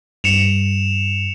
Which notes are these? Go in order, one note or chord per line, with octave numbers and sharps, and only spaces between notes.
G2 C#7 E7 F7